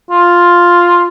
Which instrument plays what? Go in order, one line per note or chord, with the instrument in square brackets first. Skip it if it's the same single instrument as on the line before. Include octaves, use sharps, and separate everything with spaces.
[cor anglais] F4